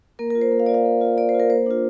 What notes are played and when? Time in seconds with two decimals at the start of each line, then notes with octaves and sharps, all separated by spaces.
0.19 A#3 A#4
0.30 A#4
0.35 F4
0.41 C5
0.52 A#3
0.60 F5
0.66 F4 D5
0.74 F5
0.85 A#3
1.01 F4
1.17 A#3 D5
1.29 C5
1.34 F4
1.40 A#4
1.50 A#3 C5
1.66 D4 F4